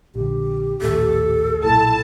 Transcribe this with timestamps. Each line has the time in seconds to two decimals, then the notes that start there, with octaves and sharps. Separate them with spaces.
0.15 A#1 D3 G4
0.82 A#1 D#2 A2 A4
1.64 B1 A#2 E4 A5